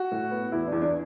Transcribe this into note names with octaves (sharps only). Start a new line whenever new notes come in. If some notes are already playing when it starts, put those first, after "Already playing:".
Already playing: F#4
A2
B3
E2 E4
E2 D4
D4